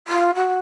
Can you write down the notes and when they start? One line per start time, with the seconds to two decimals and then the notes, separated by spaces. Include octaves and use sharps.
0.07 F4
0.34 F#4